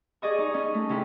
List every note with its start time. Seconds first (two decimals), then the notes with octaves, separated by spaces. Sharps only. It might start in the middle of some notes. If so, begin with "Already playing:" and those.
0.22 G#4 D5 D#5 C#6
0.38 D#4
0.54 C#4
0.74 A3
0.89 C3 C#4 E4 G4